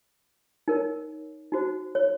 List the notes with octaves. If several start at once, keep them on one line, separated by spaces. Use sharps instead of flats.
D#4 A#4 C#5
D#4 F#4 C5
C#5